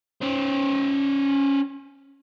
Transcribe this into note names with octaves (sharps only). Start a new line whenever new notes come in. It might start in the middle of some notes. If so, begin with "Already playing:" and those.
C#4 C5